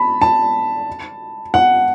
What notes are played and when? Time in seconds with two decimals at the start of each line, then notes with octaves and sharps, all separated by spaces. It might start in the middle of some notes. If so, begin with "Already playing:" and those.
Already playing: A5 B5
0.21 A5
1.54 F#5